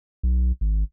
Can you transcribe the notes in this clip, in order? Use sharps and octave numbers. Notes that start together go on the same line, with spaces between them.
B1
G#1